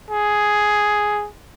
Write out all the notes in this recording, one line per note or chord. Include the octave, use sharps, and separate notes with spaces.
G#4